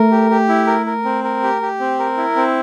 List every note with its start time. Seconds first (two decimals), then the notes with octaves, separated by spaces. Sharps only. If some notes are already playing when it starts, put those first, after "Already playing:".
Already playing: A3 A#4
0.11 G4
0.30 G4
0.49 E4
0.67 A#4
0.86 A#4
1.05 C4
1.24 A#4
1.43 G4
1.62 G4
1.80 C4
1.99 A#4
2.17 E4
2.36 C4